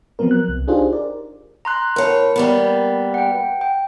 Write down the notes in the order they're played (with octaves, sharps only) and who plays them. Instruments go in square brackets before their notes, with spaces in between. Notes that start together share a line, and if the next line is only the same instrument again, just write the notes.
[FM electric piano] F3 F#3 B3 C4 A#4
F#6
C2
D4 D#4 F4 G4 G#4 C5
A#4 D5
[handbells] A#5 C6 F#6
[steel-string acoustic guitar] A2 C#5 [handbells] A#4
[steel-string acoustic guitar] G3 A#3 B3
[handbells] F#5 G5
G5